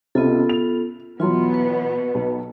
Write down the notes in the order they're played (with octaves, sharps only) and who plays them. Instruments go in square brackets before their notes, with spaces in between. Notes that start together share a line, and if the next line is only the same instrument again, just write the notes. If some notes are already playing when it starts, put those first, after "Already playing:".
[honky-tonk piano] C#2 C3 [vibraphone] B3 F4 A4
[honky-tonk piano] F7
[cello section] B2 B3 [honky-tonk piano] E3 F#3 [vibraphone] F4 C6
[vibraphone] B4
[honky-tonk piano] B1